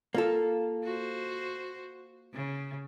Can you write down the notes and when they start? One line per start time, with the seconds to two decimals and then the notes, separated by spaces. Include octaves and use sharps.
0.14 A#3 F4 A4
0.84 F#4 C5
2.33 C#3